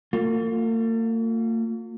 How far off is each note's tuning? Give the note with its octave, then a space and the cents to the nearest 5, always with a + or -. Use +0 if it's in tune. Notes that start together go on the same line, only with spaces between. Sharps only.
A#3 -45 F4 +30